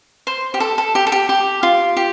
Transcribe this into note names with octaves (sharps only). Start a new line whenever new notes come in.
C5
G4
A4
A4
G4
A4
G4
G4
F4
G4